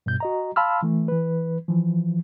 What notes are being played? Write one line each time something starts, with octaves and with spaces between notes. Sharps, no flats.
G2 B2 G6
F#4 D#5 A#5
F5 A5 B5 C6 E6 F6
E3 A3
E3 B4
E3 F3